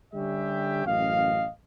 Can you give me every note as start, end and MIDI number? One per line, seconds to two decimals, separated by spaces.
0.14 0.83 50
0.14 0.83 55
0.14 0.83 61
0.14 0.83 67
0.14 0.83 76
0.14 0.83 79
0.86 1.49 33
0.86 1.49 42
0.86 1.49 75
0.86 1.49 77